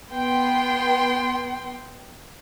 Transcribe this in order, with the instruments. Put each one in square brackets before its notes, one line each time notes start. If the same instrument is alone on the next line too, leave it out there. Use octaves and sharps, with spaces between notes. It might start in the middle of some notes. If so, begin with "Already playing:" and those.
[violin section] B3 G5 C6